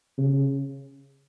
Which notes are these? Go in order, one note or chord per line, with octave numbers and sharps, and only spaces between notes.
C#3